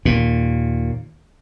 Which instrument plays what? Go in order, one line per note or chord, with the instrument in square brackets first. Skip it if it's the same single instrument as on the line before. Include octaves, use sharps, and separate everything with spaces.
[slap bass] D#2 A#2